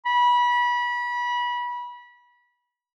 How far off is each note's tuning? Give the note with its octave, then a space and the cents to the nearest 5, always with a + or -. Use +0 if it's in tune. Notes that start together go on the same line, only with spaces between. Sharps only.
B5 -25